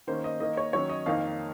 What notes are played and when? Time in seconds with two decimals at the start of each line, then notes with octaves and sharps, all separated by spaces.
0.07 D#3 A#3 C#4 C5
0.24 D#5
0.40 D#3 A#3 D#4 D#5
0.57 C#5
0.73 D#3 F#3 C#4 C#5
0.89 D#5
1.06 F2 D#3 A#3 D#4 F5